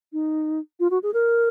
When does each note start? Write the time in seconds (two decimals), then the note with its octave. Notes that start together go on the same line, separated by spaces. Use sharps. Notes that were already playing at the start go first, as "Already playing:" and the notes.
0.13 D#4
0.80 F4
0.91 F#4
1.03 G#4
1.14 A#4